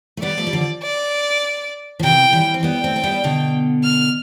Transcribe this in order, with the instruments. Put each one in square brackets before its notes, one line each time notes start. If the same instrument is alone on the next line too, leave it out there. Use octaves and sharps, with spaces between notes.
[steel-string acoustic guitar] A3
[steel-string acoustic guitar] G3 B3 [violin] D5
[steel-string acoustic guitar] F3 A3
G3
D3 F3
[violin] D5
[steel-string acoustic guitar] F3
[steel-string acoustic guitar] C3 E3 [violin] G5
[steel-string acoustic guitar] E3 G3
C4
[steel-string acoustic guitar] G3 B3 [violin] G5
[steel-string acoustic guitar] A3 C4
C4
G3 B3
B2 D3
[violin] F6